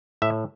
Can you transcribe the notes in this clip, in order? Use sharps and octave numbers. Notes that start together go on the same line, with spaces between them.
A2 E5